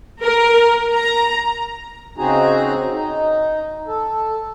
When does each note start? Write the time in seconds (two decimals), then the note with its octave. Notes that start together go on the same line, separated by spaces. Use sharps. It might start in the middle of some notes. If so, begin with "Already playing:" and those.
0.22 A#4
0.93 A#5
2.18 C#3 C4 D#4 F#4 G#4 A#5
2.92 D#4
3.87 A4